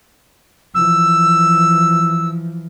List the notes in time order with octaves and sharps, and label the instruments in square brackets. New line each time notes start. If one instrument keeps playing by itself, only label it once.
[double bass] E3 F3 [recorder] E6